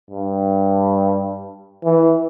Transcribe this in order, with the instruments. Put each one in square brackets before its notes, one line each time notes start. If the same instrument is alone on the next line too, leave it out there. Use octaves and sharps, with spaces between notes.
[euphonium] G2
E3